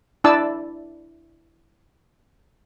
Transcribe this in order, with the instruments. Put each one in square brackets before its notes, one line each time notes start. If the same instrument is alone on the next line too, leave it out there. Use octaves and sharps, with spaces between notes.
[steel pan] D4 E4 D5 A5 E6